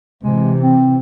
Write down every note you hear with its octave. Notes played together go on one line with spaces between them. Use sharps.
C3 E3 G#3
C4